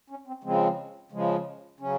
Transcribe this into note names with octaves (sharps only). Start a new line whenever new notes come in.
C#4
C4
C#3 F3 G#3 C4
C#3 F3 G#3
C#3 F#3 C#4